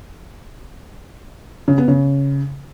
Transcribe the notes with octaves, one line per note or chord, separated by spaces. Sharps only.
C#3
B3
C#3